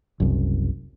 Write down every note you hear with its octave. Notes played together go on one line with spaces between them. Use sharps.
F#1 C2